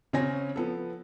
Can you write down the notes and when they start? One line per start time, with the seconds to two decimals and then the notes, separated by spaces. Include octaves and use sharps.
0.13 C#3 C4 C#4 C#5 G#5 A#6
0.56 F3 B3 A4